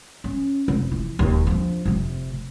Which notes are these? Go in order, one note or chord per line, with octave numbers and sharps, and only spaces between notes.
C#4
F1
E3
E1 D#2
F3 D4
F1 C3